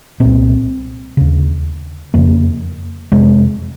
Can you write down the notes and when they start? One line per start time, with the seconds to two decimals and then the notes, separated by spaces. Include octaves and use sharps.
0.20 C2 A#2 C4
1.17 D#2 C#3
2.14 F2 C#3 A#3
3.12 F2 C3 G#3